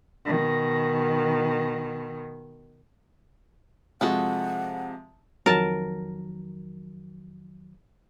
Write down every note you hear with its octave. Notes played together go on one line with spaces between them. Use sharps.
B2 D#3
C3 F3 G#3 F#4 G#4 A4 F#5
F2 D#3 F#3 A#4 A5